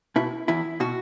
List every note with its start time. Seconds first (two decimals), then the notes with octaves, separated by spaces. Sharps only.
0.16 B2 E4
0.48 E2 E4
0.80 B2 F#4